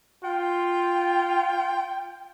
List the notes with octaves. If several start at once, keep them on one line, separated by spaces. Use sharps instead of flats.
F4 G5